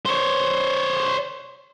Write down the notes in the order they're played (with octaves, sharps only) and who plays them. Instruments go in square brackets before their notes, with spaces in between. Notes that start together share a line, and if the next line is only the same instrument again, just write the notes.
[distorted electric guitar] C5 C#5